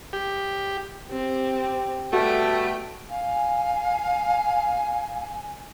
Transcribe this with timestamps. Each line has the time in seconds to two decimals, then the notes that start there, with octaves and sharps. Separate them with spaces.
0.13 G4
1.11 C4 G4
2.13 B2 G3 A3 F#4 G5
3.10 F5 G#5